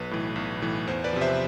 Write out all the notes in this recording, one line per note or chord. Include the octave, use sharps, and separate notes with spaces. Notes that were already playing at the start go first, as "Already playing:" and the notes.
Already playing: B1 B4
A2 E3
B1
A2 E3
E2 C5
B4 D5
C3 F3
C5 E5